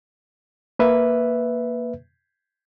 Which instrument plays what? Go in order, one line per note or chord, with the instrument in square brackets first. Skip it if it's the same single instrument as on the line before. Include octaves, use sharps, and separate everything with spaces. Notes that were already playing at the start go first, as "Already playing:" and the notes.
[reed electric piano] A#3 B4 E5